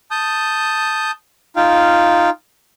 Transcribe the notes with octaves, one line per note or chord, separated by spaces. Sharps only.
A5 D#6 G6
D#4 F4 F5 G5